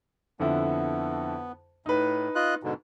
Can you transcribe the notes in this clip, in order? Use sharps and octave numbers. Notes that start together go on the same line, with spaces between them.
F2 D3 B3 E4
A2 D#4 B4
F4 D#5 F#6
G#2 B2 D3